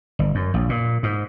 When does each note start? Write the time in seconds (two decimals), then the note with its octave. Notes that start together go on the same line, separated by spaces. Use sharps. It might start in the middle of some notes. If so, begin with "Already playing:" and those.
0.19 G1
0.35 F#2
0.54 A#1
0.69 A#2
1.03 G#2